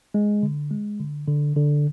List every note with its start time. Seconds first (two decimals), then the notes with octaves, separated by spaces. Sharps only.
0.14 G#3
0.43 D3
0.71 G#3
1.00 D3
1.28 D3
1.56 D3